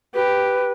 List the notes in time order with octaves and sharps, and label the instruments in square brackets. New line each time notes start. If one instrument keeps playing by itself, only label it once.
[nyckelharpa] G4 [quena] B4